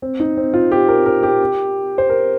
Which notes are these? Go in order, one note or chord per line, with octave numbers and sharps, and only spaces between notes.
C4
D#4
C4
F4
G4
A#4
A#4
G4
C5
A#4